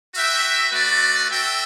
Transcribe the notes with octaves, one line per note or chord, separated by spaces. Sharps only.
F#4 B4 E5 G5
A3 D4 F#4 B4 D5
F#4 A4 E5 G5